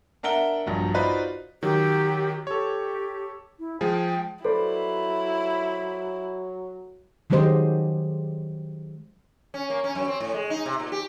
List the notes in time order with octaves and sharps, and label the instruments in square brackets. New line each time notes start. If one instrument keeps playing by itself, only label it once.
[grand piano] D4 A#4 E5 F#5 G7
A#1 G2 F#3
D#4 F4 F#4 B4 C5 D5
[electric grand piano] D#3 F#3 [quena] G4
[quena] G4 [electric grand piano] A4 C#5
[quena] E4
[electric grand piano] F3 G#3 G#4 [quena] G5
[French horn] F#3 [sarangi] E4 [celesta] A4 [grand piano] B4 C5 D5
[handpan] D#3 F#3 G#3 G4 C5 D#5
[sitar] C#4
A#3
C#4
F#2
C4
A2
G#3
D#4
C3
A#2
G4